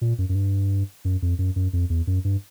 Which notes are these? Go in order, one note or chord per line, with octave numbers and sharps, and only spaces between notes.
A#2
F#2
F#2
G2
F#2
F2
F#2
F#2
F2
E2
F#2
G2